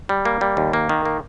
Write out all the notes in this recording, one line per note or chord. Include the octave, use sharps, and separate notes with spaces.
G3
A#3
G3
D#2
A#3
D#3
A#3